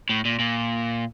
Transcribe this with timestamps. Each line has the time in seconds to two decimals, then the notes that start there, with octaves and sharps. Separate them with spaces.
0.09 A2
0.25 A#2
0.39 A#2